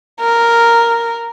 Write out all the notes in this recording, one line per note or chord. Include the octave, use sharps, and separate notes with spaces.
A#4